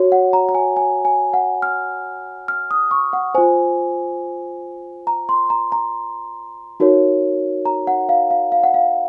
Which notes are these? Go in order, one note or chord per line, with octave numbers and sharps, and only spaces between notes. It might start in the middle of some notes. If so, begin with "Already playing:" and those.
Already playing: F#4 C#5
F#5
A#5
A#5
G#5
G#5
G#5
F#5
F6
F6
D#6
C#6
F#5
F4 C5 G#5
A#5
C6
A#5
A#5
D#4 F#4 A#4 C#5
A#5
F#5
F5
F5
F5
F#5
F5